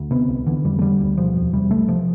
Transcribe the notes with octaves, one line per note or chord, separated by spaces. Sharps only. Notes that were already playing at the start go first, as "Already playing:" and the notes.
Already playing: D2
C3 B3
C2
D3 E3
F2 G3
A3
D3 G3
D2
B2 F3
E2
C3 G3
C2 A3
C3 F3